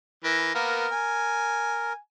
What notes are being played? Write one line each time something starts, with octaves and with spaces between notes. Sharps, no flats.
E3 A#4
A#3 B3 A#4
G#5